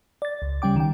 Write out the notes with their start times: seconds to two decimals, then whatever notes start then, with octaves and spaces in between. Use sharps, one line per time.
0.22 D5 A6
0.42 C#2
0.62 C#3 G3 C#4 G5 D6
0.76 D#3 G5